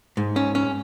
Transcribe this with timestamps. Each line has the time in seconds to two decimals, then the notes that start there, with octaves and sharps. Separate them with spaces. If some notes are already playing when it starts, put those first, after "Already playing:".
0.17 G#2
0.36 C#4
0.55 C#4